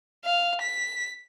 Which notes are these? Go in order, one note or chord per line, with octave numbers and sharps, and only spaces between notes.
F5
B6